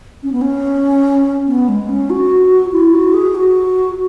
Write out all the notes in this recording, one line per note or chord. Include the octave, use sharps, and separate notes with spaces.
C#4
B3
C#4
B3
G#3
C#4
F#4
E4
F#4
G#4
F#4